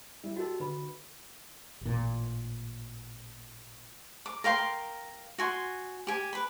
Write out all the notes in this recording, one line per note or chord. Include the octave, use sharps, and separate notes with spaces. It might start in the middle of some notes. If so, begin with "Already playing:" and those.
G3 E4
F#4 G4 A4 D#5
D3 B4 B5
A1 A#2
D6
A#4 F5 G5 C6
F#4 G#5 C6
G4 G#5
B4 B5